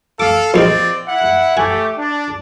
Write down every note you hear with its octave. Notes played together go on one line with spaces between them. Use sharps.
A4 F5 D6
A#1 C4 D#4 F4 D5
E4 E5 F#5
A3 G4 G#5
D4